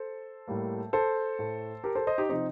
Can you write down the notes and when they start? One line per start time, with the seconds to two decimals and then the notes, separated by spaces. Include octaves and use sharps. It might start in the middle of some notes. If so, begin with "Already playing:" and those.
Already playing: A4 C5
0.48 A2 G3 A#3
0.93 A4 C5
1.39 A2 A3
1.84 G4 A#4
1.95 A4 C5
2.07 C5 D#5
2.18 D#4 G4
2.29 C3 F3 C4 D#4